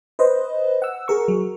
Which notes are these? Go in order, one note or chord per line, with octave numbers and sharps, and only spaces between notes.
B4 C5 D#5
F#5 E6
G#4 A#4 C#6
F#3